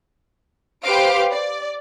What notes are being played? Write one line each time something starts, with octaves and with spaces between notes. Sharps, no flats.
G4 B4 C5 F5 D7
D5